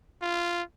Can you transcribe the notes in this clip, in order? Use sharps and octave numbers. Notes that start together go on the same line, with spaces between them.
F4